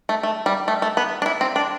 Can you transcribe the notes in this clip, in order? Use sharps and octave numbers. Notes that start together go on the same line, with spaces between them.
A3
A3
G3
A3
A3
B3
D4
E4
C4
D4